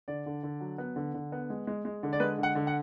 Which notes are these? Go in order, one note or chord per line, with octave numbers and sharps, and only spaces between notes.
D3 D5
D3
D3
F#3
B3
D3
D3
B3
G#3
G#3
G#3
D3
D5
G#3 B4
D3
F#5
D3
F#5